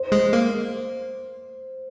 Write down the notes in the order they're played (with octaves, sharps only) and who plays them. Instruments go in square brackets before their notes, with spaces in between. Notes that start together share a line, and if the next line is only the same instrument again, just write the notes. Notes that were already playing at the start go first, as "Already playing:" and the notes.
Already playing: [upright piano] C5
[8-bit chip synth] G#3
A#3